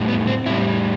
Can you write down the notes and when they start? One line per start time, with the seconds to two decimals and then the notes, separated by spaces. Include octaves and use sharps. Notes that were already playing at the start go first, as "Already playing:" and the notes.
Already playing: A2 G3
0.08 B3
0.27 C4
0.46 A2 G3 E4